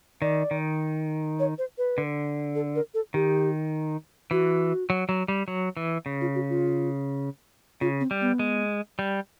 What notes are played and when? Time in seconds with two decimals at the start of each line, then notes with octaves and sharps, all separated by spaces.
0.21 D#3 D5
0.51 D#3
1.39 C#5
1.58 C5
1.78 B4
1.98 D3
2.55 A4
2.75 A#4
2.94 A4
3.14 D#3 G4
4.31 E3 F#4
4.90 F#3
5.09 F#3
5.28 G3
5.48 F#3
5.77 E3
6.06 C#3
6.21 F4
6.35 F#4
6.49 F4
7.81 C#3 F4
8.00 C4
8.11 G3
8.21 B3
8.39 G#3
8.99 G3